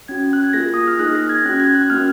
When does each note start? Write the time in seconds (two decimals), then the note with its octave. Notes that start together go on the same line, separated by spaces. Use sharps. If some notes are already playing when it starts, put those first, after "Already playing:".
0.08 C#4 F#4 G#6
0.33 F#6
0.44 G#6
0.53 A#3 F4 G#4 A#6
0.74 D#6
0.87 F6
0.99 A#3 D#4 G#4 F#6
1.15 A#6
1.29 G#6
1.45 C#4 F#4 F#6
1.60 G#6
1.75 F#6
1.90 A#3 C#4 F#4 F6